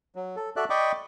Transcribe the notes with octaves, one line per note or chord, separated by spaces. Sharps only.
F#3
A4
F#4 A4 D5 E5 F#6
D5 D#5 G5 B5 C#6 D6